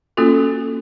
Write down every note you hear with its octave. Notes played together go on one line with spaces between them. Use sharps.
A#3 C#4 F4 F#4 A4